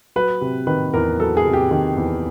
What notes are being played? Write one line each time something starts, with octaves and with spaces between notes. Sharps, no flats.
F#3 B4
C3
D#3 B4
E2 A#4
F#3 A4
G#4
C3
G4
D#3
E2